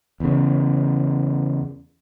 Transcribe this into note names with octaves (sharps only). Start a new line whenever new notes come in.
E2 C#3